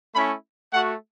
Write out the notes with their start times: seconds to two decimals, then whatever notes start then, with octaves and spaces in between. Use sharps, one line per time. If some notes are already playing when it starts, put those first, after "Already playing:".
0.14 A3 C#4 E4 B5
0.73 A3 F#4 F#5